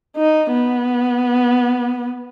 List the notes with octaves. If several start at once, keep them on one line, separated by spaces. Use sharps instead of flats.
D#4
B3